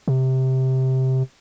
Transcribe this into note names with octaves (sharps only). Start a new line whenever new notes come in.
C3